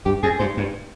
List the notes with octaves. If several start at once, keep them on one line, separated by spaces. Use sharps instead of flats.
G2 G4
F2 G#4
G2 C5
G2